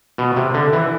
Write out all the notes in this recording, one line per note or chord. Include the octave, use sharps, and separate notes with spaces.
B2
C3
D3
E3